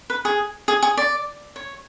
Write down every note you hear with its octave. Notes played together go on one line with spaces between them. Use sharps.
B4
G#4
G#4
G#4
D5
C#5